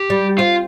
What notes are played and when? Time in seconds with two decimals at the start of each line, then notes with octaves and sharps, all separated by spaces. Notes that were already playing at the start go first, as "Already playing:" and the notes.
Already playing: G4
0.10 G3
0.38 C4 F4